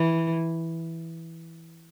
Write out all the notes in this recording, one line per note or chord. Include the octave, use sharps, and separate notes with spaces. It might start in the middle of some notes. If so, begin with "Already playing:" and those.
Already playing: E3